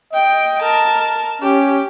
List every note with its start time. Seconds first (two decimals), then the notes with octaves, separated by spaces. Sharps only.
0.13 D#5 G5
0.62 A#4 A5
1.42 C#4 G4